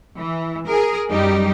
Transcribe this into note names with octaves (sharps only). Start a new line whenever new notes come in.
E3
G#4 A#4
F#2 G3 D#4 G4